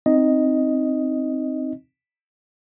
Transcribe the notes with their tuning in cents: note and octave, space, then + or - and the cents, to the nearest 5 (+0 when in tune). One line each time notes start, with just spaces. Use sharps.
C4 +0 D#4 +0 D#5 +0